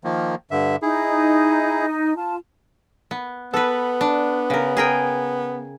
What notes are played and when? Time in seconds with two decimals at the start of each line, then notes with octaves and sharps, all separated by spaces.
0.04 D#3 F3 A#3
0.51 G2 D3 E5
0.82 D#4 E4 G#4
2.16 F4 A5
3.11 B3
3.54 B3 A4 B4
4.01 D4
4.50 C#3 A#4
4.77 G#4 A#4 G5